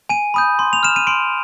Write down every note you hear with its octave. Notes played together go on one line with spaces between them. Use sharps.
G#5 D#7
B5 D#6 G6
C6
F7
F6 E7
D#7
C6 D7